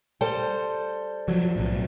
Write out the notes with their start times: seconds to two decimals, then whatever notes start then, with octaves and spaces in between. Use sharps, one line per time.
0.21 G3 A4 C5
1.28 F3 F#3
1.56 B1 A2